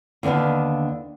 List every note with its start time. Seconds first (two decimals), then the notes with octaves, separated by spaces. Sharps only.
0.23 D#2 D3 B3 D4 F5